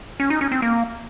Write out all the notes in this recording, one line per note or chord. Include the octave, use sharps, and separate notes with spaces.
C#4
D#4
C#4
C4
A#3